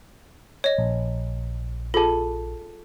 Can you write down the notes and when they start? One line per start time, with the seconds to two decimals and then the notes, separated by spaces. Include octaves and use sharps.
0.64 C#5 D#5
0.78 A#1
1.94 F4 G#4 A4 A5